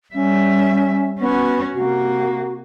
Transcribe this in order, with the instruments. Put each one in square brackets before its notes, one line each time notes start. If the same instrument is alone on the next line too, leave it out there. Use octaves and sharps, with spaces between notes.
[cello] G3 E5 [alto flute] C#4
[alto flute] B3 [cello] C#4 F#4
[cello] C3 A#3 [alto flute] F#4